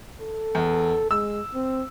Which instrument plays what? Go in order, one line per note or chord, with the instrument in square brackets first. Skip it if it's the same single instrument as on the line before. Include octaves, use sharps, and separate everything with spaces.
[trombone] A4
[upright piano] E2
[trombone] G#3 [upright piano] E6
[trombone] C4